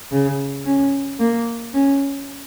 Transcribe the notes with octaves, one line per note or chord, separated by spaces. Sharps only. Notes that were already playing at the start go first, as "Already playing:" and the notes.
C#3
C#4
A#3
C#4